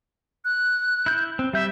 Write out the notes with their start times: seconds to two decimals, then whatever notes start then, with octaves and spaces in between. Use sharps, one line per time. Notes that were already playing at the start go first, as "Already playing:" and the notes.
0.45 F#6
1.06 E4 G6
1.39 C4
1.53 G3 E5 G6